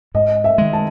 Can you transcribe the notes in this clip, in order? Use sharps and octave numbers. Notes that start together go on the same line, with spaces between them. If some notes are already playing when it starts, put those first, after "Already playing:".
G#2 D#5
E5
D#3 G#3
A5